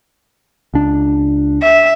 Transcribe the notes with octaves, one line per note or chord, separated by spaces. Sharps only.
C#2 D4
E5